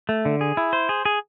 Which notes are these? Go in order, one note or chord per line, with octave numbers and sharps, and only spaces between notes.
A3
D3
G#4
E4
C5
G#4
G#4